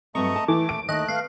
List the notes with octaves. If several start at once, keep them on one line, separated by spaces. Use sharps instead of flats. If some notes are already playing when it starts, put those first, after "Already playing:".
G2 F#3 A3 C4 D#5 A#5 C#6
A5
E3 A3 D6
D#2 D7
D#2 D#3 A3 D#5 F#6
B3 F5